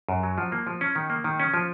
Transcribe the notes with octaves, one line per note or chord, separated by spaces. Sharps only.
F#2
F#3
F3
A#3
F3
C#4
D#3
A#3
D#3
C#4
F3